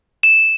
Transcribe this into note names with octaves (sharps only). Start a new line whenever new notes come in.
E7